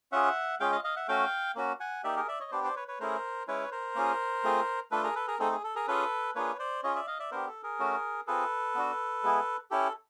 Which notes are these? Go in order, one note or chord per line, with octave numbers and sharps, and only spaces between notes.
C#4 F4 G#4 E5 F#5
G#3 C#4 F4 G#4 F5 G5
D#5 F5
D#5 F5
E5 F#5
A3 C#4 F#4 F5 G5
A#3 C#4 F#4
F#5 G#5
A#3 D#4 G4 D5 E5
G#4 A#4
D5 E5
C#5 D#5
B3 D4 G4 C5 D5
C5 D5
B4 C#5
B4 C#5
A3 C#4 E4 G#4 A#4 C5
G#3 C#4 E4 B4 C#5
A#4 C5
A#3 C#4 F4 G#4
A3 C4 F4 G#4
A3 D4 F4 A4 B4
G#4 A#4
A4 B4
G#4 A#4
A3 C4 D#4 G#4 A4
G#4
A4
G#4 A#4
C#4 F4 G#4 A4 B4
A#3 D4 F4 G#4 B4 C#5
C5 D5
C#4 F4 G#4 C#5 D#5
D5 E5
D#5 F5
D5 E5
B3 D4 G4 A#4 C5
A4
G#4 A#4
A3 C#4 F#4
C4 F4 G#4 A4 B4
B3 D4 F#4
G#3 B3 E4 G#4
C#4 E4 G4 A4